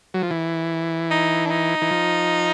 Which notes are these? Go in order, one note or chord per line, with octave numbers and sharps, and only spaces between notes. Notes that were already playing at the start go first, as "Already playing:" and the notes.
F#3
F3
E3
D#4
D4
D#4
E3
F3